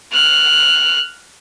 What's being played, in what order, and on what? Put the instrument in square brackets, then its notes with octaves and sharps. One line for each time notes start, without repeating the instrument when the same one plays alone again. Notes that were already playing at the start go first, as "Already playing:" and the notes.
[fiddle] F6 F#6